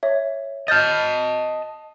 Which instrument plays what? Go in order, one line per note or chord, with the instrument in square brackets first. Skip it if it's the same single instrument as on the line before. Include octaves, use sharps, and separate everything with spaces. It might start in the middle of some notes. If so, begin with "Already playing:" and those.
[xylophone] C#5 E5
[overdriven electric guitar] D#5 A5 [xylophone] F6 G6 A6